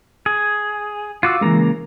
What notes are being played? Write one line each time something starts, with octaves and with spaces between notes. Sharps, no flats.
G#4
F4 F#4 F5 D6 E6
C#3 E3 G#3 A#3 A#5